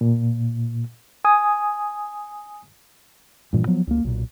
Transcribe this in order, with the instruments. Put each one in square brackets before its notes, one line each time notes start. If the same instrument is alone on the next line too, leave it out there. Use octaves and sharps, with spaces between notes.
[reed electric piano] A#2
G#5 D#6
[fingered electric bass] G2 A#2 E3
F3 F#3 B3
C#2 A#3
B1 A#2